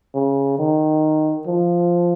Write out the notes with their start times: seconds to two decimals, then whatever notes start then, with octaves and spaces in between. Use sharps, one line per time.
0.15 C#3
0.59 D#3
1.47 F3